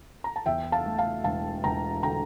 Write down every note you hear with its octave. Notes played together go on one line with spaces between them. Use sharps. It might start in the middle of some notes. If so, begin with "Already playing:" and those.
A#5
A5
E2 E5 G5
F5 A5
A3
F5 A5
E1 F5 A5
E1 G5 A#5
D3 G5 A#5